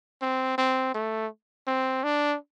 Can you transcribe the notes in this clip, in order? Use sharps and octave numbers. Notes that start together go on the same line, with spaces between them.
C4
C4
A3
C4
D4